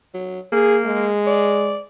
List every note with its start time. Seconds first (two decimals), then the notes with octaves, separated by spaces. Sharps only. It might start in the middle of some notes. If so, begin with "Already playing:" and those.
0.14 F#3
0.52 A#3 G#4
0.85 G#3
1.27 D5